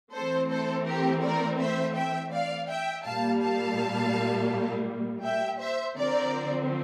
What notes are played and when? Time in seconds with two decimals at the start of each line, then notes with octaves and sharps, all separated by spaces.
0.14 E3 A3 C4 A4 C5
0.50 A4 C5
0.87 G4 A#4
1.23 A#4 D5
1.59 C5 E5
1.96 E5 G5
2.32 D5 F5
2.69 E5 G5
3.05 A#2 G3 A#3 F5 A5
3.41 F5 A5
5.23 E5 G5
5.59 C5 E5
5.96 D3 F3 C4 A#4 D5